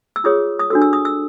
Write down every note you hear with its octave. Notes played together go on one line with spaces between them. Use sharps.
E6
F4 G#4 C#5 D#6
D#6
D4 F#4 A4 E6
E6
D#6
E6